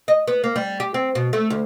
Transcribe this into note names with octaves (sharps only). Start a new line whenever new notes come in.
D#5
B3
A#3
G3
G4
C4
B2
A3
D2